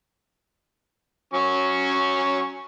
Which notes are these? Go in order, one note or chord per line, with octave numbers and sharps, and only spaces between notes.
F#3 C#4 C#6